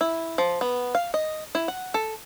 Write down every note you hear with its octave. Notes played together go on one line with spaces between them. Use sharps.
E4
F3
B3
F5
D#5
E4
F#5
A4